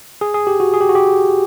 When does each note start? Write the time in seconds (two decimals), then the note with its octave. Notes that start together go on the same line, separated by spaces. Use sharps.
0.21 G#4
0.34 G#4
0.47 G4
0.60 F#4
0.74 G#4
0.81 G4
0.89 F#4
0.95 G4